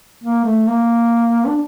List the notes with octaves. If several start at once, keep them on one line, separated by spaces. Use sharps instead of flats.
A#3
A3
A#3
D4